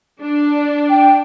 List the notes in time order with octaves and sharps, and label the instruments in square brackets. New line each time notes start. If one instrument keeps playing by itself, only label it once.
[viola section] D4
[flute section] G5